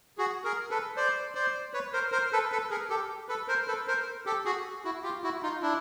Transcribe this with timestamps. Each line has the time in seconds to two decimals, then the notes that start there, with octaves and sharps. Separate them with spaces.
0.18 F#4 G#4
0.44 G#4 A#4
0.70 A4 B4
0.96 C5 D5
1.35 C5 D5
1.73 B4 C#5
1.93 A#4 C5
2.12 A#4 C5
2.32 A4 B4
2.52 A4 B4
2.70 G#4 A#4
2.90 G4 A4
3.28 A4 B4
3.48 A#4 C5
3.67 A4 B4
3.87 A#4 C5
4.26 G4 A4
4.45 F#4 G#4
4.85 E4 F#4
5.03 F4 G4
5.24 E4 F#4
5.42 D#4 F4
5.62 D4 E4